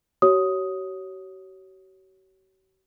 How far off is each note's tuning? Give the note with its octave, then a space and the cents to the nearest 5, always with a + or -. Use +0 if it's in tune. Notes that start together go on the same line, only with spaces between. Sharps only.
F#4 +45 C#5 +0 D#6 +5